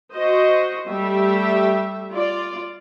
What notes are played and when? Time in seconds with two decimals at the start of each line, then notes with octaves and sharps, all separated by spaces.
0.14 F#4 C5 D#5
0.87 G3 A3 G4 E5
2.15 F4 D5